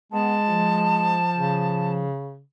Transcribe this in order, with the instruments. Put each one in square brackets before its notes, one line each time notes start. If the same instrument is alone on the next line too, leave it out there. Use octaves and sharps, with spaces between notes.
[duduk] G#3 [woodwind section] B3 [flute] A5
[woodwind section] F3
[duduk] C#3